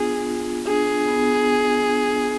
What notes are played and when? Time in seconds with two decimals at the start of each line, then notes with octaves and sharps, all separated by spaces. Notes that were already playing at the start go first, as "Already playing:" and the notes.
Already playing: B3 D4 F4 G#4
0.27 F4
0.67 D4 G#4
1.08 B3
1.48 B3
1.88 D4